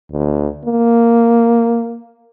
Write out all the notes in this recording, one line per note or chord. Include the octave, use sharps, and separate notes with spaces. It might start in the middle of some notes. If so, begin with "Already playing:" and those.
D2
A#3